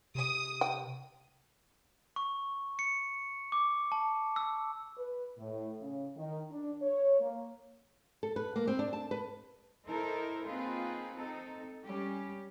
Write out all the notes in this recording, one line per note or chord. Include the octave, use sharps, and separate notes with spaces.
C3 D#6
G5
C#6
C#7
D6
A5
E6
B4
A2
C#3
D#3
D4
C#5
A#3
A4
B4
A#3
C4
D4
A5
B4
D#4 E4 A4 A#4 C5
A#3 C4 D#4 F4 G#4 B4
C4 D#4 A4
G3 C#4 G4